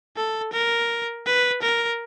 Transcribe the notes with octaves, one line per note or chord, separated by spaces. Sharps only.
A4
A#4
B4
A#4